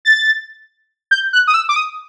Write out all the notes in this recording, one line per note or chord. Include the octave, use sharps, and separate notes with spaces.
A6
G6
F#6
D#6
E6
D6
D#6